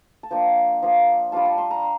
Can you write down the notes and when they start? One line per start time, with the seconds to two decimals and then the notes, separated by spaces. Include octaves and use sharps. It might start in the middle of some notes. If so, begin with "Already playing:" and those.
0.23 A5
0.31 F3 A#3 D4 G5
0.83 F3 A#3 D4
1.32 G3 D4 F4 A5
1.45 A5
1.58 C6
1.71 A#5